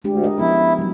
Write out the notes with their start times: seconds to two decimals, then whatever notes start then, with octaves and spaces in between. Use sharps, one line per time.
0.04 D2 G#3 D4 G4
0.23 A#4 D#5
0.38 F3 B3 C#4 E4
0.79 F#3 G3